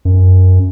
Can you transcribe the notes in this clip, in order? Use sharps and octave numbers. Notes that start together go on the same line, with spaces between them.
F#2